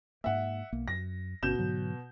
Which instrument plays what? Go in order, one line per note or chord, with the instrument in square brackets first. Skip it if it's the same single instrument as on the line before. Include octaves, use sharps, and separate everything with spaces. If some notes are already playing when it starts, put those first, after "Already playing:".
[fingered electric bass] G#2 A#3 [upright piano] E5 F#5
[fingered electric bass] B1 A#3
[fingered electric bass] F#2 [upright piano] A#6
[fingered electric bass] G1 C#4 [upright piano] B2 G6 E7
[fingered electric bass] G#2 D3 F#3